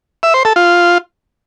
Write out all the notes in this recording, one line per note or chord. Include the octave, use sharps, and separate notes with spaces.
E5
C5
A4
F4